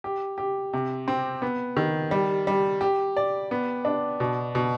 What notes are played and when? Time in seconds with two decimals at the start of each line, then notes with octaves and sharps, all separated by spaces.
0.04 G4
0.38 G4
0.73 C3
1.08 C4
1.42 B3
1.77 D#3
2.11 G3
2.47 G3
2.81 G4
3.17 D5
3.51 B3
3.85 D4
4.20 B2
4.55 B2